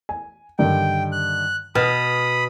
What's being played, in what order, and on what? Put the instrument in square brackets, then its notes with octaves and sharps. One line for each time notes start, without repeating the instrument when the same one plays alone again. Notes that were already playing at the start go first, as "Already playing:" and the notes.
[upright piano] G#5
[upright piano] G2 D3 D#3 [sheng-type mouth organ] G5
[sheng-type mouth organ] F#6
[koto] B2 [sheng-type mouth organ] B5 D#6 [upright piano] F6